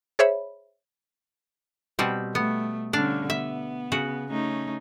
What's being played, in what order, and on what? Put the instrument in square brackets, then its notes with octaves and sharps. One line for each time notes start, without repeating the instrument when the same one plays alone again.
[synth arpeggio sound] G#4 C5 C#5 E5 B5
[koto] B2 G3 C4
[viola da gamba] A3 [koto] B3
[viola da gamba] D3 G3 C#4 [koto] D4 F5
[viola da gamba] B3 [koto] E5
[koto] C#3 F#4
[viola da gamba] A3 C#4 D#4